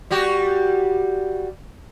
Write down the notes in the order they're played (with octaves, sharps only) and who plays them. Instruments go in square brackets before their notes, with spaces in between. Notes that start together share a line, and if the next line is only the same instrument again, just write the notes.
[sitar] G3 F#4 G4